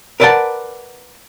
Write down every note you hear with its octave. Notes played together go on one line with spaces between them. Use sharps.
A#4 B4 D5 E5 F#5 A5